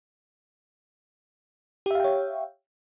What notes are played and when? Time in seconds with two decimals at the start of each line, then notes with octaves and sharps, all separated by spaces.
1.86 G4
1.91 E5
1.95 F5
2.00 G5
2.04 C#5